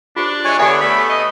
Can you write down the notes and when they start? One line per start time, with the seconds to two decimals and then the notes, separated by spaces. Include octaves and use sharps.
0.16 D4 F4 G4 C5
0.45 E3 G#3 C#5 G#5
0.59 D3 B3 G4 C#5 E5 G#5
0.81 A3 B5
1.10 D#5